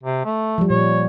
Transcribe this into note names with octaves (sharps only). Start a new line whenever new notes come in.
C3
A3
F3 G3
A#2 C#5